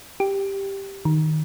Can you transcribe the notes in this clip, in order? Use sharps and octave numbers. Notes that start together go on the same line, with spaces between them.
G4
D#3